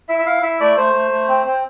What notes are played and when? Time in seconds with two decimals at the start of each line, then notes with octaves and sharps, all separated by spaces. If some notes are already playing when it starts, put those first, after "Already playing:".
0.08 E4 E5
0.19 E5
0.26 E4 F5
0.42 E4 E5
0.60 A3 D5
0.77 A3 C5
0.94 A3
1.11 A3
1.28 C4
1.46 C4